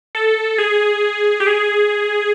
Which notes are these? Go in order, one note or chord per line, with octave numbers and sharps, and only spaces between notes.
A4
G#4
G4
G#4